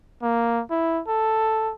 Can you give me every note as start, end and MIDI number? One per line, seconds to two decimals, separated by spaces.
0.23 0.62 58
0.71 1.01 64
1.08 1.73 69